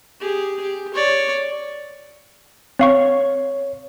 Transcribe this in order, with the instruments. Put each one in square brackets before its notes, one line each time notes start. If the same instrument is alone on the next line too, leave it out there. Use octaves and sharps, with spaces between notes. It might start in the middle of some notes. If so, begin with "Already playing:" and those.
[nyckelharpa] G4 G#4
G4
C#5 D5
[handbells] C4 F5 C#6 [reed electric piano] C#5